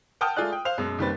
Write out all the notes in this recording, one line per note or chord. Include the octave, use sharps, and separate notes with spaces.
F#5 G5 A5 D#6 F6 G6
G#3 A3 F4 G#4 D5 F#6
G5
C5 F5 F7
F#2 B2 G#3
F#1 D#3 G3 C4 B4 A6